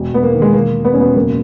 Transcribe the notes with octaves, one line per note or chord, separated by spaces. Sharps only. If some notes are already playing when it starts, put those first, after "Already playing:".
Already playing: E1
E1 B3
A#3
D#3
G#3
E1 A#3
E1
B3
E1 C#4
B3
F#1 A#3